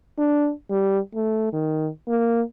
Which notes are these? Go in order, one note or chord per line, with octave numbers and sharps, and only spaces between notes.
D4
G3
A3
D#3
A#3